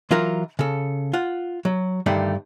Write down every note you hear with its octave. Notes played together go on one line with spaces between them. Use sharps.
E3 F#3 F4 F#4 A#4
C#3 A4
F4 F#5
F#3
G2 D3 D#3 A3